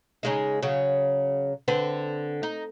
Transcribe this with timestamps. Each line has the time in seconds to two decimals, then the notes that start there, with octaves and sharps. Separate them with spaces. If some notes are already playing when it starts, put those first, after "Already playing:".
0.23 C#3 G#3 D#4
0.63 C#3 F#3
1.68 D3 C4 B4
2.43 D#4